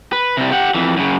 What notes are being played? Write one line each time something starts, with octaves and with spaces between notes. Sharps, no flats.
B4
C3 G3
G4 F#5
F2 E3
F#2 C#3